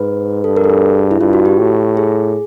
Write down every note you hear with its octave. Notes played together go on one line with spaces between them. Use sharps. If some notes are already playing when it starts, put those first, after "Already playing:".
Already playing: G#2 B4
G2 A4
A#4
A4
G#4
E4
G2 F4
F#4
G4
A2
G#4